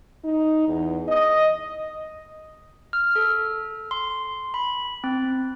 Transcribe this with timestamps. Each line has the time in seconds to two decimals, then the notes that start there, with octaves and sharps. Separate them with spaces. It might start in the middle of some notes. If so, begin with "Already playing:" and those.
0.24 D#4
0.68 E2
1.08 D#5
2.93 F6
3.16 A4
3.91 C6
4.54 B5
5.04 C4